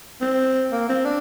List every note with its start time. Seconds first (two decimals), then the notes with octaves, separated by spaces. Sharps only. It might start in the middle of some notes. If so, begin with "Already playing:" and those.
0.21 C4
0.72 A#3
0.89 C4
1.05 D4